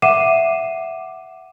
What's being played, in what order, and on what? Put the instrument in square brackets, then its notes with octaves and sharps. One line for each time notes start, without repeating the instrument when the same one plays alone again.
[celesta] E5 F#5 D6 C7 D#7 E7